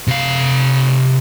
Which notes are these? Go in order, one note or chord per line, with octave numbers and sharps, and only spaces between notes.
C3 F5